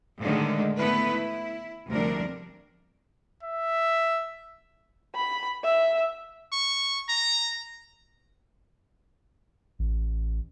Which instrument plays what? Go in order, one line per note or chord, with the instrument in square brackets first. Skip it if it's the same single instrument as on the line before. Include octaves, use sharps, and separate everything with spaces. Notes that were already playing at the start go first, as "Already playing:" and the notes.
[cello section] A2 D3 D#3 G#3
A3 B3 E4 B4
E4
D2 C3 F3 G3 D4 A#4
[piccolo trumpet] E5
[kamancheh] B5
E5
[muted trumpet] C#6
A#5
[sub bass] A1